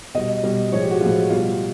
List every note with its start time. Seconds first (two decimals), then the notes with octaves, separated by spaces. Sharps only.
0.15 B2 G3 D#5
0.43 B2 G3
0.72 A2 F3 G#3 C#5
0.82 G4
0.91 F#4
1.01 A2 F3 G#3 F4
1.30 B2 G3 F4